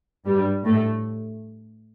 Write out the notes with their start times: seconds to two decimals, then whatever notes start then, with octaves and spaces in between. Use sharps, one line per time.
0.25 G2 G3
0.65 A2 A3